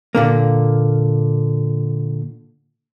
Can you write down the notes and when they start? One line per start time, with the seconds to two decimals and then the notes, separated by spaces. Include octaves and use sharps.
0.15 A#2 D3 A#3